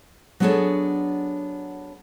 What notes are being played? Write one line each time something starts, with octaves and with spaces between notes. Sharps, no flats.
F#3 B3 D4 G#4 A4 C#5